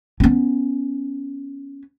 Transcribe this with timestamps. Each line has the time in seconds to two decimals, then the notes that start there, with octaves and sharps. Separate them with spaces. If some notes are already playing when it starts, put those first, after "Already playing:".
0.20 B3 C#4